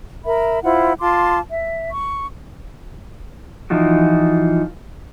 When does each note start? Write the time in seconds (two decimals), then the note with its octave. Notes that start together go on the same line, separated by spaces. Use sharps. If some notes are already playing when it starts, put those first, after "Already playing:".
0.24 A#4 E5 B5
0.62 E4 F4 C5 F#5
1.00 F4 A5 C6 D6
1.49 E5
1.90 C#6
3.70 E3 F3 D#4 F4 F#4